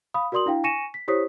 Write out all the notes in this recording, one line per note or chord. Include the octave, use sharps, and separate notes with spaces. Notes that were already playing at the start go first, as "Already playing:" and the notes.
F5 B5 D#6
F#4 A#4 D5 C6 D#6 F#7
D4 E4 F5 G5
G#5 C#6 A#6 C#7 D#7 E7
B6
E4 G4 C5 C#5 D#6 B6